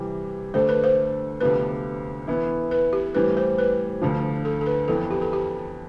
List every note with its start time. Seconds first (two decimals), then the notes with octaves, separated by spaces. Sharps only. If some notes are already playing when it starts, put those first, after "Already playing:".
Already playing: C3 E3 G3
0.54 D2 D3 A3 D4 A4 C5
0.69 B4
0.84 C5
1.41 D2 C3 F3 B3 D4 B4
2.27 E3 B3 E4
2.71 B4
2.93 G4
3.15 A2 E3 G3 C4 B4
3.37 C5
3.59 B4
4.02 D2 D3 F3
4.45 A4
4.61 A4
4.66 B4
4.88 F2 E3 B3 A4
5.11 G4
5.21 A4
5.33 G4